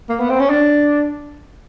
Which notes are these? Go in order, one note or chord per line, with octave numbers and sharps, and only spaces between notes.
A#3
B3
C4
C#4
D4